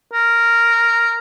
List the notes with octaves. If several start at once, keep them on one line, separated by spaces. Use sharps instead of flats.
A#4